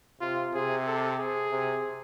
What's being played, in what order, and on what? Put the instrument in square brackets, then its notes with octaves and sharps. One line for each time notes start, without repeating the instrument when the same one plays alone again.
[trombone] C3 [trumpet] F4
[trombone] C3 [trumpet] G#4
[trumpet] A4
G#4
[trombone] C3